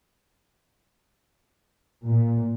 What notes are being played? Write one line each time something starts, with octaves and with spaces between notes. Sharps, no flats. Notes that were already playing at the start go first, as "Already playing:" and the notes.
A#2